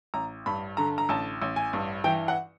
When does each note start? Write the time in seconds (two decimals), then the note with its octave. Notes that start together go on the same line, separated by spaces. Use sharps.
0.14 A1 A#5
0.46 G2 B5
0.77 D3 A#5
0.98 A#5
1.09 A1 A5
1.42 A1
1.56 G#5
1.73 G2
2.04 E3 G5
2.28 F#5